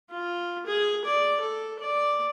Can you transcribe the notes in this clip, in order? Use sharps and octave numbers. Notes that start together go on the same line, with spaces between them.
F4
G#4
D5
A4
D5